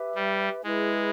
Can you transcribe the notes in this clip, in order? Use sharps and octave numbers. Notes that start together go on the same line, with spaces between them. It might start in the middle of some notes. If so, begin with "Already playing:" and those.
Already playing: G4 B4 E5
G3
G#3 E4 G#4 B4